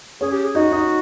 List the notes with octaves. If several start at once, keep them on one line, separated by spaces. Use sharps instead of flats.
C#4 G#4 C#5
G4
G#4
D#4 F#4 D#5
D#4 D#5